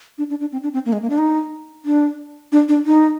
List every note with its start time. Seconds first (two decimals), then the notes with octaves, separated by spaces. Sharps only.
0.18 D4
0.30 D4
0.41 D4
0.52 C4
0.63 D4
0.74 C4
0.86 A#3
0.93 G#3
1.02 A#3
1.10 D4
1.18 D#4
1.85 D4
2.52 D4
2.68 D4
2.85 D#4